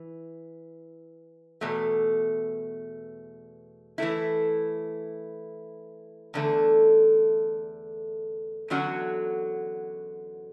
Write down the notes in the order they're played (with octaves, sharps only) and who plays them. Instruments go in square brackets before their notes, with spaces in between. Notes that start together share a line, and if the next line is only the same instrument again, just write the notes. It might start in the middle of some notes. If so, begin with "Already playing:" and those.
Already playing: [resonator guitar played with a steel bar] E3
E2 B2 A3
E3 A3 E4
E2 D3 A3
E2 D3 F#3 C#4 F#4